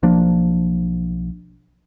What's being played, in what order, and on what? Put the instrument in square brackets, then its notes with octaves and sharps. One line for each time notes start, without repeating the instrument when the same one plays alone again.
[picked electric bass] B1 F3 A#3 D4